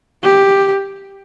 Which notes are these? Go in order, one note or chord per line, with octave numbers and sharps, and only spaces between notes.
G4